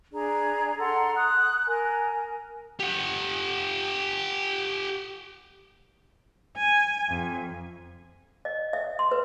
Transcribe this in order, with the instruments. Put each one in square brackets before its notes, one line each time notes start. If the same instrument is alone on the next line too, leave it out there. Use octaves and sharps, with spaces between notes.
[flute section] D4 G#4 D5 A#5
A4 F#5 A#5 C6
D#6 F#6
A#4 G#5
[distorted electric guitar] G4 F#5
[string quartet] G#5
F2
[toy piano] D#5
E5
C6
B4